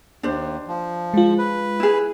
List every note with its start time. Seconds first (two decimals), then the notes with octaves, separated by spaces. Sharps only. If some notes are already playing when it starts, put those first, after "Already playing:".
0.23 D#2 D4 C5
0.68 F3
1.14 G#3 F4
1.38 B4
1.80 E4 G#4